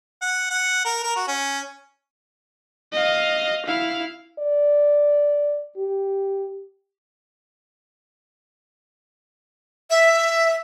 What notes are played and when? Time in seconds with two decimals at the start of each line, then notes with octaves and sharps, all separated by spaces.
0.21 F#5
0.50 F#5
0.85 A#4
1.03 A#4
1.16 F#4
1.28 C#4
2.93 D#5 F5
3.66 E4 F5
4.39 D5
5.77 G4
9.90 E5